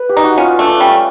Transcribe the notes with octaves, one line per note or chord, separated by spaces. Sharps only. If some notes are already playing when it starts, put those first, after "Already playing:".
Already playing: B4
G4
D#4
F#4
C#4 F4
A3 D4
D4
G3 C#4